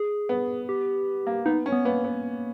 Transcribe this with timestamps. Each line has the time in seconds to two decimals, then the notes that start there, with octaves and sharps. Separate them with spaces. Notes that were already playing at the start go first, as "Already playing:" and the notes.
Already playing: G#4
0.29 B3
0.69 G4
1.27 A#3
1.46 B3 D#4
1.66 C#4
1.72 B3
1.85 A#3 B3
2.04 B3